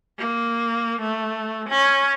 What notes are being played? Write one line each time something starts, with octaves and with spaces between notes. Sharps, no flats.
A#3
A3
C#4